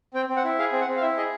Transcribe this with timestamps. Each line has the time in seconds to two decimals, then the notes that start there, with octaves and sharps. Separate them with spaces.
0.14 C4 G5
0.29 C4
0.36 F#5
0.44 E4
0.59 G#4 F5
0.72 C4
0.80 F#5
0.88 C4
0.97 F5
1.02 E4 E5
1.17 G#4 D#5